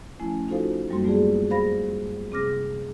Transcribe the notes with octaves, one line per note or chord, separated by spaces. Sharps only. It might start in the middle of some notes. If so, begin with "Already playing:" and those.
F3 A3 C#4 E4 G#5
D#4 F4 F#4 A4 C5 F5
F#2 F#3 G3 A#3 F#4 C6
A3 B3 F4 G4 G#4 D5
G#4 C5 F5 B5 A#6
C3 C4 G#4 D6 F6 A#6